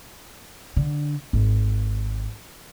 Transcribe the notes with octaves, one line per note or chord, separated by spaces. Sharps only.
D3
G#1